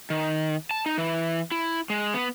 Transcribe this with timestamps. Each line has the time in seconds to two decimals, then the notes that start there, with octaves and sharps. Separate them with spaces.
0.10 D#3
0.71 A5
0.86 D#4
0.98 E3
1.51 E4
1.90 G#3
2.14 B3